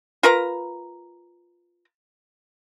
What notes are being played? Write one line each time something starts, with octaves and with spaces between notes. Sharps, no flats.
F4 A#4 B4 A#5